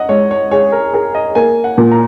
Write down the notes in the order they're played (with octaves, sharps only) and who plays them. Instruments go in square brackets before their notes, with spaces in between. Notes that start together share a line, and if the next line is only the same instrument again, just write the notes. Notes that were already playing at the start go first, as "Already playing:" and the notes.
Already playing: [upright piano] D#5 F#5
[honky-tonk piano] G#3 [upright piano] C#5
[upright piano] C#5
[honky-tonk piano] G#4 [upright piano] C#5
[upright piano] A#4
[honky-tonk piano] G#4 [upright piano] A#4
[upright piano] D#5
[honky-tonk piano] A#3 [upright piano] G#5
[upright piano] F#5
[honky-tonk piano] A#2
[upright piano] A#5